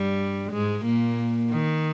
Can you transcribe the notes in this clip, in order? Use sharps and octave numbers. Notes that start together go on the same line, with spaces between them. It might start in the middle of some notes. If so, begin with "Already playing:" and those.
Already playing: G2 G3
G#2 G#3
A#2 A#3
D#3